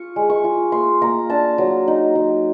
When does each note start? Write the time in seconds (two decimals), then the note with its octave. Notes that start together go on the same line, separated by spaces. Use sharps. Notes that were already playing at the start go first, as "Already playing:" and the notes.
Already playing: F4 C#6
0.16 G#3
0.30 C#6
0.44 F4
0.72 A#3 C6
1.02 A#3 A#5
1.30 D4 A5
1.58 F#3 A#5
1.88 D#4
2.15 F#3